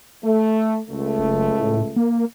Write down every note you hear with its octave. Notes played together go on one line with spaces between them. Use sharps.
A3
C#2 A3
F#1
A2
A#3